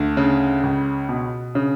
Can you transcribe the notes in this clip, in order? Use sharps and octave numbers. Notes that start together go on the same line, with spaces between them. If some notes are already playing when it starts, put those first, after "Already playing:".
Already playing: D2
C#3
C#2
B2
C#3